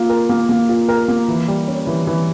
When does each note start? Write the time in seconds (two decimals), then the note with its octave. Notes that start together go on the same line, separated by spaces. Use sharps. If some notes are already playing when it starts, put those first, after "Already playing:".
Already playing: A#3 F4
0.09 A#4
0.29 A#3
0.49 A#3
0.69 F4
0.89 A#4
1.08 A#3
1.28 E3
1.48 G3
1.68 C#4
1.87 E3
2.07 E3